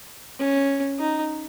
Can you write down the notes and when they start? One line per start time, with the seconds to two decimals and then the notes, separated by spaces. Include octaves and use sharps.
0.39 C#4
0.99 D#4